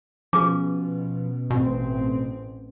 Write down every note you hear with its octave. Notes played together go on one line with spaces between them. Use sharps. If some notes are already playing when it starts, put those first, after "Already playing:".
B2 F3 C#4 F#4 G#4 D6
A1 B2 C4